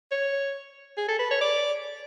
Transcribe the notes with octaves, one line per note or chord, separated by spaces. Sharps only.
C#5
G#4
A4
B4
C#5
D5